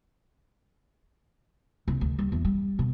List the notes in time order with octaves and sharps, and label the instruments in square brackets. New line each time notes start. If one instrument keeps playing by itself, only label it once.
[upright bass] C2
D2
G3
E2
G3
B2